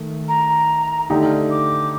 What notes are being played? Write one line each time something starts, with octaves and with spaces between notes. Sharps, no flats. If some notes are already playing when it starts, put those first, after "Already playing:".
Already playing: D#3 A3
A#5
D3 A3 D#4 G4
D6